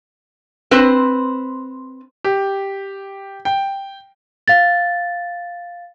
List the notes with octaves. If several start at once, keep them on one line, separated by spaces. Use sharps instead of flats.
C4 B4 C5
G4
G5
F5 A6